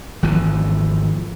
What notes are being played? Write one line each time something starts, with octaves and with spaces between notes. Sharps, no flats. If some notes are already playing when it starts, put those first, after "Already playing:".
G#1 E3 F3